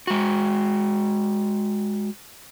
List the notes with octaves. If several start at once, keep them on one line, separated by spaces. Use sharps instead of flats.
G#3 F#4